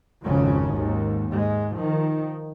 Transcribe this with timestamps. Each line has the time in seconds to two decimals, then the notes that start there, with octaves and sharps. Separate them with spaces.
0.24 G#1 F2 C#3 C#4
0.74 D#2 G#2
1.31 G#2 G#3
1.75 D#3 F3